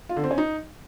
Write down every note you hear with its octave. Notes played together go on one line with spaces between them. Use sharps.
F4
D3
C4
C#4
D#4